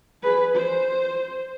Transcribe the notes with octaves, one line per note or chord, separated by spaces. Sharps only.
G#4 B4
C5